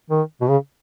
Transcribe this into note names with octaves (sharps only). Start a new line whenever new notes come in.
D#3
B2
C#3